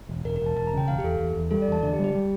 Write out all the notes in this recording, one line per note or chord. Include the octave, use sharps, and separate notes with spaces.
E1
E1 A#4
A#4
E1 A5
E1 A5
A#5
C#3 G5
E1 F5
G4
E2 A4
E2
E2
G3 A4
D5
E2 A5
D3 D5
G4
G3
G4
G3